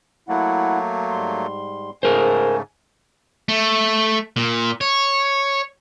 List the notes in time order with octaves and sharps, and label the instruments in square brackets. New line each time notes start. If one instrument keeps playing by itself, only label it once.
[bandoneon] F#3 A3 A#3 [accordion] E4 F#5
[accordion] G#2 G3 C6
[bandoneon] G#2 C#3 A3 [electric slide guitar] G#4 A#4 C5 [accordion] G#5
[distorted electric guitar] A3
A#2
C#5